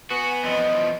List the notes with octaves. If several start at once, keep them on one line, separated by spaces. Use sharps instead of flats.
B3 F#4 G#5
E2 F3 D#5